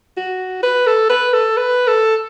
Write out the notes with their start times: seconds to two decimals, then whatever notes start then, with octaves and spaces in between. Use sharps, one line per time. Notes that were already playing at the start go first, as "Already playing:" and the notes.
0.17 F#4
0.63 B4
0.86 A4
1.10 B4
1.33 A4
1.57 B4
1.87 A4